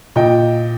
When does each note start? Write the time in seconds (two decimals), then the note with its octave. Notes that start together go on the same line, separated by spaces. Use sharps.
0.16 A#2 D#5 G5